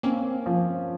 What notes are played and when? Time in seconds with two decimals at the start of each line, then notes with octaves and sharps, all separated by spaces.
0.03 A#3 C4 C#4
0.46 F3